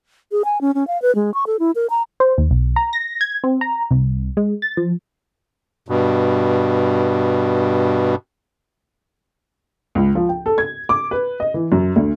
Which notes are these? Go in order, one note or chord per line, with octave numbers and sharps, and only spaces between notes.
G#4
G#5
C#4
C#4
F5
B4
G#3
C#6
A4
E4
A#4
A#5
C5
D#2
B1
A#5
A#6
G#6
C4
A#5
C2
G#3
A6
F3
G2 B2
C#2
F3
G5
A4
G#6
D6
B4
D#5
E3
F#2
D2